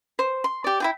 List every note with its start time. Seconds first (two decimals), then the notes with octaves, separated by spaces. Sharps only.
0.19 C5
0.44 C6
0.64 G4 D5
0.80 E4 F4 G5